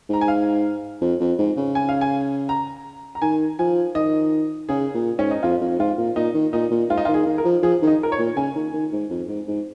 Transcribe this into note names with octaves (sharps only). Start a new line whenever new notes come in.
G#2 A#5
G#5
F5
F2
F2
G#2
C#3
G#5
F5
G#5
A#5
A#5
D#3 G#5
F3 G#5
D#3 D#5
C#3 G#4
A#2
G#2 C#4
D#4
F2 F4
F2
G#2 F4
A#2
A#2 D#4
D#3
A#2 D#4
A#2
G#2 F4
D#4
F4
D#3
G#4
D#3
A#4
F3
F3 G#4
D#3
D#4
A#4
C#5
A#2
C#3 G#5
D#3
D#3
G#2
F2
G#2
G#2